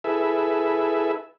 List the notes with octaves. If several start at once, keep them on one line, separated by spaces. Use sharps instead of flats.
E4 G#4 A4 B4 E5